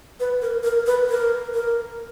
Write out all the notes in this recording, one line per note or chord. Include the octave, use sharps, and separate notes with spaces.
B4
A#4
A#4
B4
A#4
A#4